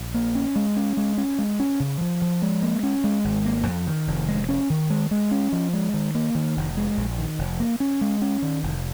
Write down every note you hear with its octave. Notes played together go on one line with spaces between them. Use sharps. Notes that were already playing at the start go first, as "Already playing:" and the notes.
Already playing: A#1
A#3
C#4
G#3
C#4
G#3
C#4
G#3
C#4
C#3
F3
F3
G#3
A#3
C#4
G#3
G#1
A#3
F2
D#3
F1
G#3
C#4
D#3
G#3
G#3
C#4
F3
G#3
D#3
A#3
D#3
F1
G#3
A#1
D#3
F1
A#3
C#4
G#3
C#4
D#3
F1